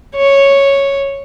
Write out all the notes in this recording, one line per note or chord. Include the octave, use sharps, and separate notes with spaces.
C#5